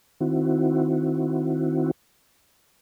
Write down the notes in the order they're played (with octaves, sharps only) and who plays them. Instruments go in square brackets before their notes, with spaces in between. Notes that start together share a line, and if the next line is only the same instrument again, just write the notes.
[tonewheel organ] D#3 C4 E4 F#4